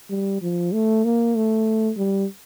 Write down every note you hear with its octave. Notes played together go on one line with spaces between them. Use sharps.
G3
F3
A3
A#3
A3
G3